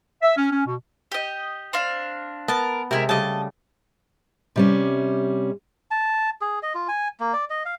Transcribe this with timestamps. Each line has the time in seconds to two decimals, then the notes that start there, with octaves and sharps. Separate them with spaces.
0.22 E5
0.37 C#4
0.51 C#4
0.66 B2
1.12 G4 D#5
1.73 C4 D4 F5
2.48 B3 A#4 A5
2.91 C3 G#3 E4 A#4
3.09 C#3 G3 A3 D#5 A5
4.56 C3 G3 C#4
5.91 A5
6.41 G#4
6.63 D#5
6.75 F4
6.88 G#5
7.20 A#3
7.33 D5
7.50 D#5
7.65 F5